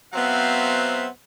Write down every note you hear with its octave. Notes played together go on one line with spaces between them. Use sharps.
F#3 B3 C4 C5 E5 F5